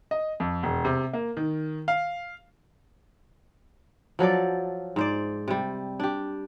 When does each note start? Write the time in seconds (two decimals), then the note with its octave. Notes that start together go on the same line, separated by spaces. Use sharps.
0.11 D#5
0.40 F2
0.63 E1
0.85 C3
1.13 A#3
1.37 D#3
1.88 F5
4.19 F3 F#3 A4 D5
4.96 G#2 C5 D5
5.48 C3 G3
6.00 D4 G4